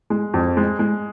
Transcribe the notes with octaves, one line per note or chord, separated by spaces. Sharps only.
G#3
F2
G#3
G#3